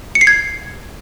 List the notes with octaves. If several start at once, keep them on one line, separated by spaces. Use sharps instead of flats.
C#7
C7
G#6